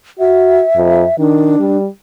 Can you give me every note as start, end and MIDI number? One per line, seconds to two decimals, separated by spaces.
0.19 0.62 66
0.19 1.16 76
0.76 1.03 41
1.19 1.56 51
1.19 1.78 62
1.59 1.87 55